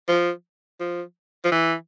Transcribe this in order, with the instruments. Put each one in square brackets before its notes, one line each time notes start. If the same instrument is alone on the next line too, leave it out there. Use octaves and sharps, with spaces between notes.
[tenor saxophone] F3
F3
F3
E3